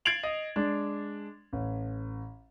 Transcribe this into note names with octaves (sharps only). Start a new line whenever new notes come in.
G#6 A6 C7 D7 F7 F#7
D#5
G#3 D4
A1